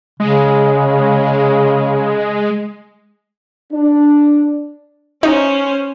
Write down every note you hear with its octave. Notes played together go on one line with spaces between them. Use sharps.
C#3 G#3
D4
C#4 D#4 C5